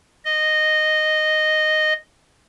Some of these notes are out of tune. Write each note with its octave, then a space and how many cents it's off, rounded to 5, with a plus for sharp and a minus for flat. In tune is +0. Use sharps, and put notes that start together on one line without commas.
D#5 -10